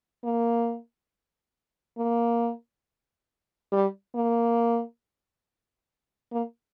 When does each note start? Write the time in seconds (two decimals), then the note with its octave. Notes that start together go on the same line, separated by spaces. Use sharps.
0.24 A#3
1.98 A#3
3.72 G3
4.15 A#3
6.33 A#3